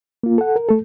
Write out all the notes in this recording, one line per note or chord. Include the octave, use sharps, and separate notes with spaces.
A#3 F4
A4 F#5
A#4
A3 A4